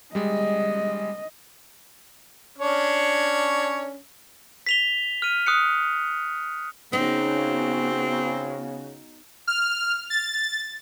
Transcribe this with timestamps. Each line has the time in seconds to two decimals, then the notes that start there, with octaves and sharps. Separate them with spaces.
0.15 G3 G#3 D#5
2.58 C#4 D4 C#5
4.66 B6 F7 G7
5.22 F6 D#7
5.47 D#6 F#6 C#7
6.93 C#3 B3 C4 D#4 F#4
9.47 F6
10.10 A6